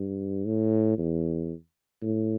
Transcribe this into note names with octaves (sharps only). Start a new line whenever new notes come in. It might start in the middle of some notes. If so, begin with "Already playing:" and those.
Already playing: G2
A2
E2
A2